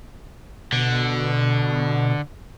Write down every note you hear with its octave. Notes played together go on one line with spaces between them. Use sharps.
B2 D3